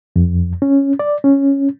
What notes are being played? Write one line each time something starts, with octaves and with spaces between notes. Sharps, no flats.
F2
C#4
D5
C#4